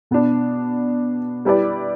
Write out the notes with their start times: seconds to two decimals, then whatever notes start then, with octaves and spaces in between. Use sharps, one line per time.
0.11 B2 B3 D4
1.45 G3 E4 G4 B4 D5